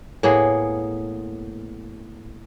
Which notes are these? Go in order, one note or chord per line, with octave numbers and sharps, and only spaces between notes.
A2 A#3 B3 G#4